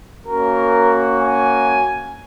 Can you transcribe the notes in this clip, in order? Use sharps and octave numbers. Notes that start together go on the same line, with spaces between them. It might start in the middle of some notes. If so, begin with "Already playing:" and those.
A#3 C#4 F#4 A#4
G#5